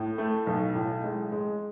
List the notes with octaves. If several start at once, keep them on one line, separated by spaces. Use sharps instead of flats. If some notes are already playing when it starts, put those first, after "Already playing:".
Already playing: A2
A3
B1
A2
G#3
G#3